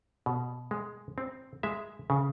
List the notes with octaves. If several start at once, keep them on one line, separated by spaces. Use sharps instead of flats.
B2
G#3
C4
G#3 E5
C#3